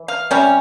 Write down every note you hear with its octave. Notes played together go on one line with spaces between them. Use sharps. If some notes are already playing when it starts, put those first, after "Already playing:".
Already playing: E3
F5
C3 G3 C#4